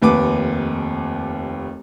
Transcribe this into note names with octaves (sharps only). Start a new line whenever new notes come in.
F1 D#2 B4 D6